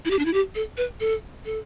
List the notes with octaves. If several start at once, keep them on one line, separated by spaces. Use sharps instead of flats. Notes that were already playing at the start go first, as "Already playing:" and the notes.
E4
G4
D4
E4
G4
A4
B4
A4
A4